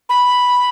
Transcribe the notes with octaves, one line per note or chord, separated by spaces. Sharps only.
B5